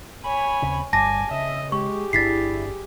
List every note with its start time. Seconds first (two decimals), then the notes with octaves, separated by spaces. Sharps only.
0.24 C#5 G#5 B5
0.62 D#2 C#3 C4
0.93 G1 G3 G#5 A5 D6 A#6
1.31 C#3 D#5 E5
1.72 G#3 G4 G#4 C#6
2.13 G1 D4 E4 A6 B6 C7